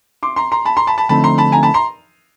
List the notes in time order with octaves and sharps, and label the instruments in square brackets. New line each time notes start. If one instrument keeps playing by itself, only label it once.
[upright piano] C6 D6
A#5 C6
A#5 C6
A5 B5
A#5 C6
A5 B5
A5 B5
[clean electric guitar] D3 F3 A3 C4 D#4 [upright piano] A5 B5
[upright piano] A#5 C6
A5 B5
G#5 A#5
A5 B5
A#5 C6